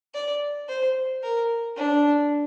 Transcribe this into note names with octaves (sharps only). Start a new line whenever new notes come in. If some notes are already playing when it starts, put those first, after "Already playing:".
D5
C5
A#4
D4